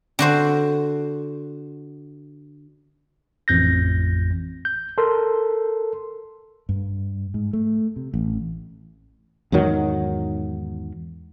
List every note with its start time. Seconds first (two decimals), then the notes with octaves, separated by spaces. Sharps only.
0.19 D3 F#4 C5
3.48 A1 F2 G6 A#6
4.65 G6
4.98 A4 A#4 C6
6.69 G2
7.34 G#2
7.53 A3
7.96 C3
8.14 A1
9.52 E2 G#2 D#3 F#3